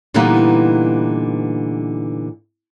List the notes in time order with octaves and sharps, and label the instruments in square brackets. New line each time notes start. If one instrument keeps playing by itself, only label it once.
[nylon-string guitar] A#2 D3 E3 G3 B3 D#4